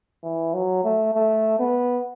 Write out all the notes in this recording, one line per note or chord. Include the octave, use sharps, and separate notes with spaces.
E3
F#3
A3
A3
B3